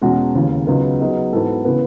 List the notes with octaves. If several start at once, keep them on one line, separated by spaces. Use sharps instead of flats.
E2 B2 G#3 C#4 F#4
D#2 C#3 E3
C#2 C#3 F#3 B3 D#4
F#3 B3 D#4 G#4 D#5
G#2 E3 B3 F#4 A4
C#3 E3 B3